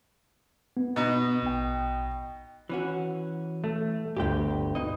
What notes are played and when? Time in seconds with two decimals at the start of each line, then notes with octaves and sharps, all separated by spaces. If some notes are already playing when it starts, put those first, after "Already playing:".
0.77 B3
0.96 B2 D#4
1.42 A#1 G5
2.69 E3 C#4 F#4
3.64 A3
4.17 G1 D2 G4 G5
4.75 B2 D#4 D#5